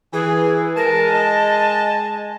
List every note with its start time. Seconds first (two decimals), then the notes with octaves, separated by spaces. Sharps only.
0.13 E3 G#4
0.77 G#3 A#4 G#5 A5
1.14 D#5